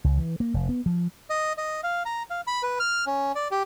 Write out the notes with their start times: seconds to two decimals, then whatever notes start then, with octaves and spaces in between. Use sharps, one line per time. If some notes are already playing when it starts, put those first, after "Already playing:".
0.04 C#2
0.18 E3
0.40 A#3
0.54 F1
0.69 B3
0.86 F3
1.30 D#5
1.58 D#5
1.83 F5
2.05 A#5
2.30 F5
2.47 B5
2.63 B4
2.80 F6
3.06 C#4
3.35 D5
3.51 G4